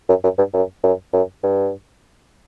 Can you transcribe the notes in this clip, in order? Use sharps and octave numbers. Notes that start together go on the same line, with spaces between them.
F#2
F#2
G2
F#2
F#2
F#2
G2